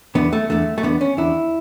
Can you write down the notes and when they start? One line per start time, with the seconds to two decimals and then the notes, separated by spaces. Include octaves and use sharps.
0.15 E2 D3 B3
0.33 A3
0.50 E2 D3 A3
0.78 A3
0.83 E2 D3 B3
1.01 C#4
1.17 E2 D3 E4